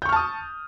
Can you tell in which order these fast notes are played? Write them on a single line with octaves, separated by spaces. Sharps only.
G6 C#6 F6 A5 D#6